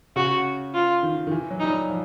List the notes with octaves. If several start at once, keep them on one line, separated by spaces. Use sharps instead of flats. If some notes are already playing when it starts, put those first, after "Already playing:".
C#3 F#4
F4
D#3
D#3
E3
F#3
G3 D#4
F#3
F3